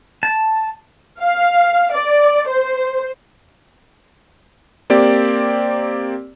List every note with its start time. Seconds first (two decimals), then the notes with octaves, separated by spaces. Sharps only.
0.23 A5
1.20 F5
1.93 D5
2.48 C5
4.90 A#3 C4 G4 D5